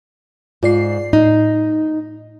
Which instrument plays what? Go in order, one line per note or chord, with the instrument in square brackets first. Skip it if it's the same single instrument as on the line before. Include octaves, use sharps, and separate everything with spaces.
[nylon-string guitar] G#2 [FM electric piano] F4 D5 C7
[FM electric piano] A2 [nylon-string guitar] D#4